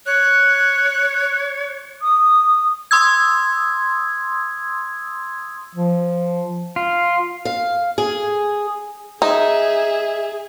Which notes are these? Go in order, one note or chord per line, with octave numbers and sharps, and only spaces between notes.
C#5 F#6
D#6
C6 D#6 E6 G#6
F3
F4
F5
G#4
D#4 G#4 E5